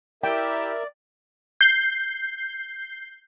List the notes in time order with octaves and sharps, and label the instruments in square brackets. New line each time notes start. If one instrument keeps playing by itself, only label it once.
[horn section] E4 G4 [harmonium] A#4 E5 [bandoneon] D5 [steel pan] G5
[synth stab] G6 C7